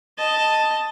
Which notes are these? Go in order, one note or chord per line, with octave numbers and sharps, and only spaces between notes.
D#5 A5